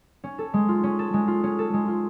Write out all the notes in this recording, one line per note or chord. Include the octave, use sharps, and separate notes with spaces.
C#4
A4
G#3
F4
C#4
A4
G#3
F4
C#4
A4
G#3
F4